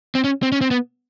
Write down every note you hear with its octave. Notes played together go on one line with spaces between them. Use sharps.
C4
C#4
C4
C#4
C4
B3